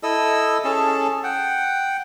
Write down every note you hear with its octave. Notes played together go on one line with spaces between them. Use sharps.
E4 A4 D#5 E6
C#4 G#4 A4 A5
F#5 G5